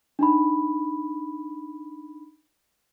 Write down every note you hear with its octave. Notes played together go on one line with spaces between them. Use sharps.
D4 D#4 B5